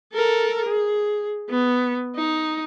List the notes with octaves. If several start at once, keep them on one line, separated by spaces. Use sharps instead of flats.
A4 A#4
G#4
B3
D#4